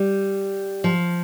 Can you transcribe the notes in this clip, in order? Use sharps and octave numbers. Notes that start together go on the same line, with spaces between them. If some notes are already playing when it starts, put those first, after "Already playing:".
Already playing: G3
F3